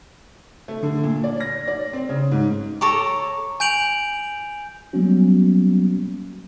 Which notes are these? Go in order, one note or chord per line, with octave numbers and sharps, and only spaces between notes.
A3
D3
A#2
D5
A#6
D5
C4
C#3
G#2
A4 C#5 A#5 D6
G#5 G6 D7 F7 F#7
F#3 G3 A#3 B3 C#4 F#4